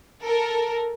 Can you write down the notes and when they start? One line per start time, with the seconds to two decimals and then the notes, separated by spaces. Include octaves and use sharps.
0.22 A4 A#4